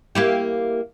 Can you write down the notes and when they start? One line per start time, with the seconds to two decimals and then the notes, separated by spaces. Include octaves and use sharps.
0.15 A#3 E4 G4